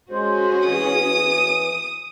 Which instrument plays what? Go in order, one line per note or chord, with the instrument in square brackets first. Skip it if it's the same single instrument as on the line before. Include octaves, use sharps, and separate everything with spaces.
[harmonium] G#3 C5 [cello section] C#4 F#4 G#4
[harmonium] E3 [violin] D#6